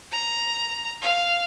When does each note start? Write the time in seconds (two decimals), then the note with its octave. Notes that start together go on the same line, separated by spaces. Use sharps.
0.12 A#5
1.02 F5